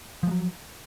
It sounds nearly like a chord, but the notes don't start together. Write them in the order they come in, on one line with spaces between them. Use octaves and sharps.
F3 G#3 F#3